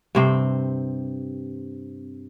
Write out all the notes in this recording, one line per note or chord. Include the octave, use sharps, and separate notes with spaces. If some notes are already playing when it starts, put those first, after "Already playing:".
G2 C3 C4